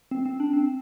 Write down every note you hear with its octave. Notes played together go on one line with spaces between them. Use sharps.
C4
C4
D4
C4